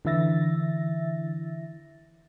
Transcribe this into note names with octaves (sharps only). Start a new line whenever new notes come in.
D3 E3 E4 E5 A6 A#6